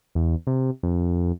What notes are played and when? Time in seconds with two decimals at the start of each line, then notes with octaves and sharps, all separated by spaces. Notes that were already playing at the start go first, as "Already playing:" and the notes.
0.15 E2
0.47 C3
0.83 F2